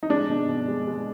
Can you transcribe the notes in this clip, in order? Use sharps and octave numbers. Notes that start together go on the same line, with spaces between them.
D#4
G#3 D4
B2
B2
G#3
G#3